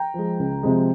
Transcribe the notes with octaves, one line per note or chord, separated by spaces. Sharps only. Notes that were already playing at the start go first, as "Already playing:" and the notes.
Already playing: G5 A#5
F3 G#3
C#2
C3 F3 G#3